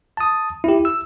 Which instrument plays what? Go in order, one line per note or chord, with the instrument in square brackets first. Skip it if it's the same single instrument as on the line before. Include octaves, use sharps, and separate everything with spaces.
[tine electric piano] A5 D#6
E4 G4
E6